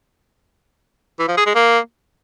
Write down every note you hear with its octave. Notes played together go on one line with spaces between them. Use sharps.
E3
F3
G#4
G#3
A#3